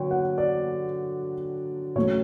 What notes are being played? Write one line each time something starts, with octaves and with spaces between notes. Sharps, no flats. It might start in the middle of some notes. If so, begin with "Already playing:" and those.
Already playing: D3 F#3 C#5 G5
F#5
D5
C#3 F#3 A3 C#5